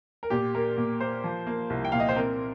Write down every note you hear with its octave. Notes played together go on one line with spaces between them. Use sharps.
A#4
A#2 G4
A#3 A#4
A#2
A#3 C5
F3
A#3
C2
G5
A#2 F5
D#5
C5
C4 A#4